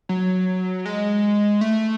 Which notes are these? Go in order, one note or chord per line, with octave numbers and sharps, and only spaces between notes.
F#3
G#3
A3